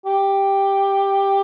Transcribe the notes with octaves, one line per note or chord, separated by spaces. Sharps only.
G4